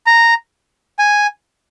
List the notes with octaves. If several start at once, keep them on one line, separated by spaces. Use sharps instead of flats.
A#5
G#5